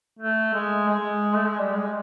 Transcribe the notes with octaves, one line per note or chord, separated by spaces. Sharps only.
A3
G#3
G#3
A3
G#3
G3
G#3